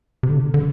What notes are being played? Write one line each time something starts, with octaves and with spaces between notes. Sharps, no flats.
C3
D3
D3